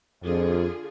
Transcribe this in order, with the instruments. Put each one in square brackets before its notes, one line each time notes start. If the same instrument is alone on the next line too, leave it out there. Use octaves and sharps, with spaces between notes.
[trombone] F2 [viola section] D3 F4 G#4